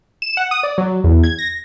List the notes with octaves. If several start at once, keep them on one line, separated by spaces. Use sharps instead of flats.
E7
F#5
D#6
D5
F#3
E2
G#6
A#6